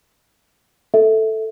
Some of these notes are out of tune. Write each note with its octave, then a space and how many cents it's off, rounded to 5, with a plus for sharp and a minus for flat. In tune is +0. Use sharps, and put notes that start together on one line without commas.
A4 +0 E5 -15